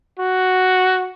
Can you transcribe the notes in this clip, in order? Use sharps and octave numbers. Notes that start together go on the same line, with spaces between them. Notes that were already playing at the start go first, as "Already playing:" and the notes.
F#4